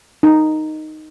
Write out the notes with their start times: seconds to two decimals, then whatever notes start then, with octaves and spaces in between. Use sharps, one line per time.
0.23 D#4